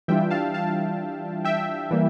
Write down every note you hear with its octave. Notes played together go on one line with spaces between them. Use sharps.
E3 G3 D4 F4 E5 G5
F5 A5
F5 A5
E5 G5
E3 G3 A#3